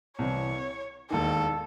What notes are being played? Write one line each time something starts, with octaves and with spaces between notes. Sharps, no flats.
C2 C3 E3 C#5
E1 D#2 D#3 A4